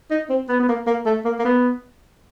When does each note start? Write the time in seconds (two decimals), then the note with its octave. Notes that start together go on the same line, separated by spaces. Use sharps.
0.11 D#4
0.30 C4
0.49 B3
0.59 B3
0.69 A#3
0.87 A#3
1.06 A3
1.25 A#3
1.39 A#3
1.45 B3